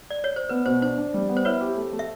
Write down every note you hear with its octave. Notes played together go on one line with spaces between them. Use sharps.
D5
C#5
C5
B3 B4
B2 C5
D4 C5
D4
G3
B3
C5
E4 B4 C#5
G4
A3
A3
E5